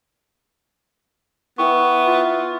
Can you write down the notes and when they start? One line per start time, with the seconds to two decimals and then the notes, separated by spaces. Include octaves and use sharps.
1.58 B3 E4 B4 G5 C#6
2.06 F4